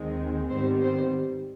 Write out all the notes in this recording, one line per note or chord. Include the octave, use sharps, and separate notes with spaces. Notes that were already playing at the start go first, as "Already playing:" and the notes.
Already playing: D#2 D#3 G#3 C4
G#2 D#3 G3 B3 C4 C5
C4 C5